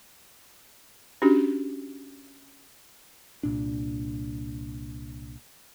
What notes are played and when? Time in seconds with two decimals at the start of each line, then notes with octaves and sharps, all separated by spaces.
1.22 C#4 D4 F#4 G4
3.43 C2 A#2 D4